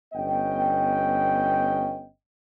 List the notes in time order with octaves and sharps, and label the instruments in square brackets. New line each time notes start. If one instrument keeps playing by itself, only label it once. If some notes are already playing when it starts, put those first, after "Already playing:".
[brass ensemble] G1 B3 C#4 D#5 G5